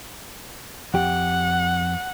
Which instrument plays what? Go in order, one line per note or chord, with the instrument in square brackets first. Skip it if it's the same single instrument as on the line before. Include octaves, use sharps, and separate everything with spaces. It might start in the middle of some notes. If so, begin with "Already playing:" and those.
[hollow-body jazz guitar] F2 G4 [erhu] F#5